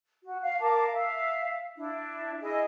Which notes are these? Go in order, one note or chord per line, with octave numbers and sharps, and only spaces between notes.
F#4
F5
A#4 F5 A5 D6
E5 F5
D4 E4
E4 G#4 D#5